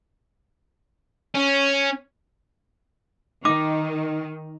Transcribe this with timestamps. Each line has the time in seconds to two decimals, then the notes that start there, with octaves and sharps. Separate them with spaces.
1.35 C#4
3.45 D#3 D#4 D6